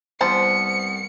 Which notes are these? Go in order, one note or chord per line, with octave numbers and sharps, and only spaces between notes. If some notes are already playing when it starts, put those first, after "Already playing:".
C2 B3 C5 A5 C#7